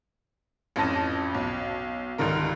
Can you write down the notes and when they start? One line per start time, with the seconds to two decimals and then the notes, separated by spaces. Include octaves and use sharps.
0.76 A1 F2 C#4 A5 A#6 D#7
1.34 B1
2.18 C#2 G2 D3 D#3 A#4